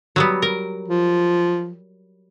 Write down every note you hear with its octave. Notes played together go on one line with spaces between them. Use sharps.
F#3 G3 B3
A#4
F3